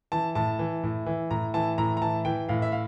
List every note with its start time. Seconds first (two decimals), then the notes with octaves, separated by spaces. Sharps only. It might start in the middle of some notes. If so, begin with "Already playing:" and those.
0.12 E3 A5
0.35 A2 A5
0.59 E3
0.83 A2
1.06 E3
1.31 A2 A#5
1.54 E3 A5
1.78 A2 A#5
1.97 A#5
2.02 E3 A5
2.25 E3 G5
2.49 A2 F5
2.62 E5
2.72 F5